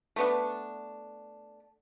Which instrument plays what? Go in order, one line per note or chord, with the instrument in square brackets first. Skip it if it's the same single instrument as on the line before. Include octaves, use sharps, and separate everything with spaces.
[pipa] A3 B3 D4